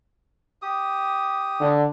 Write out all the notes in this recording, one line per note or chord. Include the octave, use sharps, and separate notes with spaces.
G4 D#6
D3